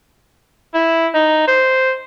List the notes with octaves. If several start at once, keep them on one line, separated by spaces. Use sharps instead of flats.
E4
D#4
C5